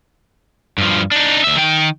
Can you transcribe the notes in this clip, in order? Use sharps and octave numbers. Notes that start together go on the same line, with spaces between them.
G2 F3
D4 D#4
D2 E5
D#3 G5